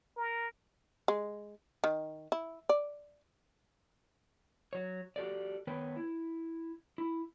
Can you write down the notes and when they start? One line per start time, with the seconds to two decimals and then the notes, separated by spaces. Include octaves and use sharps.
0.17 A#4
1.08 G#3
1.84 D#3
2.32 E4
2.69 D5
4.73 F#3 C#5
5.16 F#4 G4 A4 D5
5.67 D#3 B3 B4 C#5 G5
5.96 E4
6.98 E4